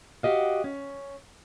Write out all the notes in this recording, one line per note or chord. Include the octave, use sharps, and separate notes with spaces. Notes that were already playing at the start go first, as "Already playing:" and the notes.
F#4 G4 D#5 F5
C#4